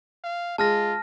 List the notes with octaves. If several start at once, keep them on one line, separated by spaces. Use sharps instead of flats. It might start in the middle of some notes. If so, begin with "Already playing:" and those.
F5
G#3 F4 A5 F6 A#6